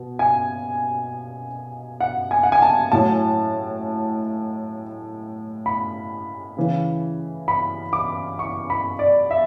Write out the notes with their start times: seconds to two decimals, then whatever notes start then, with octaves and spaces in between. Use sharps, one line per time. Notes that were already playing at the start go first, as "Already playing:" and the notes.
Already playing: B2
0.19 G#5
2.00 F#5
2.31 G#5
2.43 F#5
2.52 G#5
2.62 A5
2.92 A2 F#3 A5
5.66 B5
6.57 C#3 E3
7.48 B5
7.93 D6
8.39 C#6
8.70 B5
8.99 D5
9.31 E5